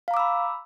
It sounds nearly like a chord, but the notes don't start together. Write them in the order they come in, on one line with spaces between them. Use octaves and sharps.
F5 A#5 D6 E6 B5